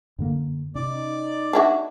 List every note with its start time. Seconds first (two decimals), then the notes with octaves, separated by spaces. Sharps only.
0.19 F#2 D3 A#3
0.75 C3 C#4 D#4 D5
1.53 D4 E4 F#4